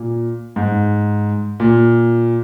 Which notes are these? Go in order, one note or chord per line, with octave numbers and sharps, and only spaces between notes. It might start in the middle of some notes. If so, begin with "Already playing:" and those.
Already playing: A#2
G#2
A#2